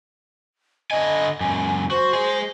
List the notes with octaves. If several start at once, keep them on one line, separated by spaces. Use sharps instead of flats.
D3 D#5 G#5
C#2 F#2 G#5
F#4 C5
G#4 D#5